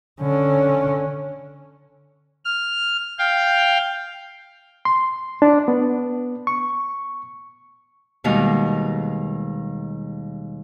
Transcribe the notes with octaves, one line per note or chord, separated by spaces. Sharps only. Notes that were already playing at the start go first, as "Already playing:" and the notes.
D3 C#4
F6
F5 G5
C6
D4
B3
C#6
D#2 B2 D#3 G3 G#3 F5